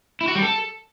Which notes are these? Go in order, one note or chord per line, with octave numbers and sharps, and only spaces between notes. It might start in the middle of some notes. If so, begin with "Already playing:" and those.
E4
F#4
G3
A4